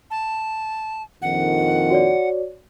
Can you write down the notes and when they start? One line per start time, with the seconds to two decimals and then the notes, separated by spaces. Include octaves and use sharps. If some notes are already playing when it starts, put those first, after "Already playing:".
0.11 A5
1.22 A#1 F2 D#3 F#5
1.90 F#4 C#5 D5